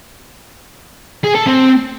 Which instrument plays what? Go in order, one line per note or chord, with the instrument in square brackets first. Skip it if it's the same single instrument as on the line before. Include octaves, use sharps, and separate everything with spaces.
[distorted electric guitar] G#4
A4
C4